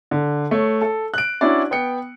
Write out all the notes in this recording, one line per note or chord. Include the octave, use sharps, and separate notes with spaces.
D3
A3 C#5
A4
F#6 D7
C#4 D4 E4 F#4 D5
B3 G5 C#7